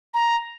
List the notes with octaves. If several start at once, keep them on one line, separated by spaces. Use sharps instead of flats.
A#5